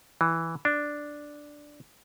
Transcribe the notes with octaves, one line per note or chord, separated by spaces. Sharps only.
E3
D4